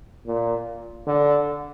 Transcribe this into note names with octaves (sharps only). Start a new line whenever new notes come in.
A#2
D3